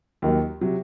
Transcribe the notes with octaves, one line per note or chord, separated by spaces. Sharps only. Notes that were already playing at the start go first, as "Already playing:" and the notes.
D#2 D#3 F#3
C3 F#3